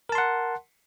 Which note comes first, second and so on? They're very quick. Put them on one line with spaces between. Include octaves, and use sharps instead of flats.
A#4 A5 C6 F#5